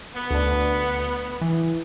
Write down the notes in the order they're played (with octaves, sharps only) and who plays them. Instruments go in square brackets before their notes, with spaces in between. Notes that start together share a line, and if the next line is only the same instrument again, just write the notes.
[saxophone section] B3
[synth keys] D2 D4
E3